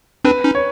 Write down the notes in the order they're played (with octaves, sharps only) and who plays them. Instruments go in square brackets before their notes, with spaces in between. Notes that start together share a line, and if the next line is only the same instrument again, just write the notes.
[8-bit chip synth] C4 D4 [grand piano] B4
[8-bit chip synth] C#4 D#4
[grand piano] C#5